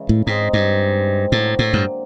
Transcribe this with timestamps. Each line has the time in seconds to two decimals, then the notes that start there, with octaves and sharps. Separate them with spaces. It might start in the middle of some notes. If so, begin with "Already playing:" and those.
Already playing: C#3 E3 G#3
0.09 A2
0.26 G#2 G#3 C4 D#4
0.53 G2
1.32 A2 D3 F#3 A#3
1.59 A2
1.73 G2